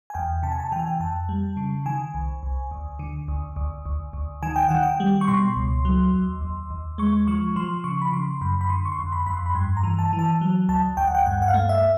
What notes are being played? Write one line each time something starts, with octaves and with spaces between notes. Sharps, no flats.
G#5
E2 G5
C3 A5
G#5
A5
E3 G5
G#5
G5
F2 A5
G3
C#3
D#3 G#5
C2
C2
D2
D3
D2
D2
D2
D2
D#3 G#5
G5
D#3 F#5
G5
G3
C#6
B2 C6
C#2
F#3
D#2
D#2
D#2
G#3 C#6
F3 C#6
F3 C6
C#3 C#6
B5
C#3 C6
F#2 B5
B5
D3 C6
C#6
C6
F2
B5
F2 B5
C6
B5
G2 C6
A#5
E3
A5
E3
A5
F#3
D2 A5
D2 G5
F#5
G5
G2 F#5
F#5
F5
A3
E5